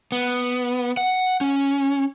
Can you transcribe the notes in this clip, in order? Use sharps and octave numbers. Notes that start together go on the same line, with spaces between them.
B3
F#5
C#4